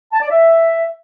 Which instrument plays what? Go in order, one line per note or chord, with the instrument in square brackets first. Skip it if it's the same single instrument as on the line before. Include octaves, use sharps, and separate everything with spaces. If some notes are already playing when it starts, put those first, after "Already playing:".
[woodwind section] A5
D5
E5